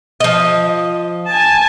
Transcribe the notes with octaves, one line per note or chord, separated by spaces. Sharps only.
F3 D#5
G#5 A5